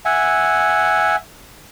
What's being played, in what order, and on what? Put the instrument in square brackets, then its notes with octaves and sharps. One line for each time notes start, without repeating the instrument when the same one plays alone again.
[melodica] E5 F#5 G#5